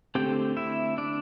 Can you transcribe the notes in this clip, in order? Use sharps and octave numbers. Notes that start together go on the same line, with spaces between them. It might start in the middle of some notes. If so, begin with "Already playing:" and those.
D3 A3 C4 G4 G5
E4 E5
D4 D5